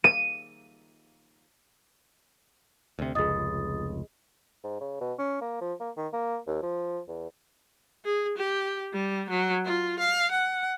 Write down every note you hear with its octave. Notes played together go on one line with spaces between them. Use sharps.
D#7
D2 C3
F1 C#2 G#4 D#5 D#6 A6
G#2
C#3
B2
C#4
A#3
F3
A#3
D#3
A#3
D#2
F3
E2
G#4
G4
G3
F#3
F4
F5
F#5